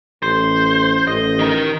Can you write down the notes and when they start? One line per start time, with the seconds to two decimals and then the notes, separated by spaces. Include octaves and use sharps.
0.23 A1 C5
1.08 A1 D#5
1.39 D#3 A#4